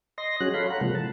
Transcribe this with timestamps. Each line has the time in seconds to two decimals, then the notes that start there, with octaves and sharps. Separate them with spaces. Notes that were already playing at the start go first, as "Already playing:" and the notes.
0.18 D#5 C6 A#6
0.40 F#3 C#4 F#4 G#4 F#6
0.54 A4 C#5 F5 B5 C6
0.70 F#5 A#5 F#6
0.81 C3 E3 F3 G#3 A#3
0.95 A5